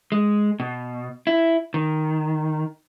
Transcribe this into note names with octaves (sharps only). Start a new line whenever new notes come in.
G#3
B2
E4
D#3